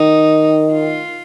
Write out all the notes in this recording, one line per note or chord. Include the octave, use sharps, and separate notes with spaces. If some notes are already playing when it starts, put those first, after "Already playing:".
Already playing: D#3 D#4
F4